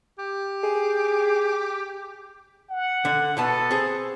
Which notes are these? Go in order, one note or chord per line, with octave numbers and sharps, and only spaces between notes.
G4
G#4
F#5
D3
B2 B3 A4 A5
C4 G#4